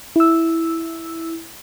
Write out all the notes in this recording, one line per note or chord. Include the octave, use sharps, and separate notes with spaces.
E4 E6